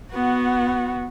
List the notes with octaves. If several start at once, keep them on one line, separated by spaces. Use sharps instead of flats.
B3 F#4